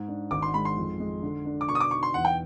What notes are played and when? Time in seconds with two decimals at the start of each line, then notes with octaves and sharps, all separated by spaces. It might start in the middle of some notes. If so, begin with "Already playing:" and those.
Already playing: G#2
0.08 D4
0.31 G#1 D6
0.42 C6
0.54 G#3 B5
0.65 C6
0.77 F2
1.00 G#3
1.23 D3
1.45 D4
1.61 D6
1.69 B2 C#6
1.75 D#6
1.80 D6
1.91 D#4 C#6
2.03 C6
2.14 E2 F#5
2.25 G5